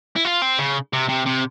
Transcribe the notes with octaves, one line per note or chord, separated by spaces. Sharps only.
E4
F4
C4
C#3
C3
C3
C3